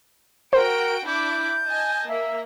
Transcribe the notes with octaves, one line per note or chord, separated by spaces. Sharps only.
F#4 A#4 C5 G5 D7
D4 E4 D6 G6
D#5 G#5 A5
A#3 E5